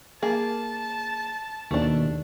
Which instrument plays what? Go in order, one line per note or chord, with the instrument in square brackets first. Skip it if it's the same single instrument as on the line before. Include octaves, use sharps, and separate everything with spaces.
[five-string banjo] A#3 G#4 [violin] A5
[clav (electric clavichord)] D#2 B2 [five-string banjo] A3 D4